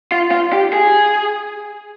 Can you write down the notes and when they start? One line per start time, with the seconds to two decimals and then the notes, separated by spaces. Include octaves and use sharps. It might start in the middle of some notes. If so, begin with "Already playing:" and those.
0.12 F4
0.31 F4
0.53 G4
0.73 G#4